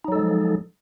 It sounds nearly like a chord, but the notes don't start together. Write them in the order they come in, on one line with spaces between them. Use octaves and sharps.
D#4 F#3 A4 G#3 F3